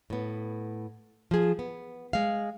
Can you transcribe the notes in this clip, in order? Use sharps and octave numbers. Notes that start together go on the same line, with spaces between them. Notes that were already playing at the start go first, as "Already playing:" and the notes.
A2 B3
F3 G#4
B3
G#3 F5